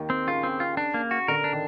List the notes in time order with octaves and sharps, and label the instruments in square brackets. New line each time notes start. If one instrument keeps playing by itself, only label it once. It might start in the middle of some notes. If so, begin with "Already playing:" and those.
Already playing: [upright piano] D#2 D#3
[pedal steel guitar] C4
[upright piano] C#3 [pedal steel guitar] F4
[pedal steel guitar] C4
F4
D4
A#3
F#4
[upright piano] D3 [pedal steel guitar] A#4
[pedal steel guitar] D4
[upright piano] D#3